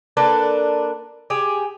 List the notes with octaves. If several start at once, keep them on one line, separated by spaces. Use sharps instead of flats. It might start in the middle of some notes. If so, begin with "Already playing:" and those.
A#3 D4 A4 B4
G4 G#4